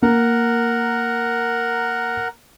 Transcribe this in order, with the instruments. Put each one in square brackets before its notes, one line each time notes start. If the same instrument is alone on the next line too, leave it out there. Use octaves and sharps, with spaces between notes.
[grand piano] A#3 [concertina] A#4 F#5